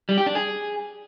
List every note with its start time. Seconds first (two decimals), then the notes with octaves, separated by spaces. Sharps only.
0.09 G3
0.18 G4
0.26 D4
0.35 G#4